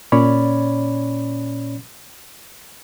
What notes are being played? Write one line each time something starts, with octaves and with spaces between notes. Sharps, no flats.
A#2 C#4 C#5 D5 B5